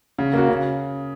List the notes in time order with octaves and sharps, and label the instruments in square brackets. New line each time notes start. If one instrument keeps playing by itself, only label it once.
[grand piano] C#3
A#3 F#4
C#3